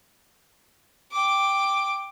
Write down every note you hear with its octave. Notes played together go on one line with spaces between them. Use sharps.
G5 D6